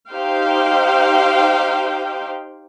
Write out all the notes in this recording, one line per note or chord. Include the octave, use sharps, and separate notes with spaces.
D#4 G4 C5 F5 G5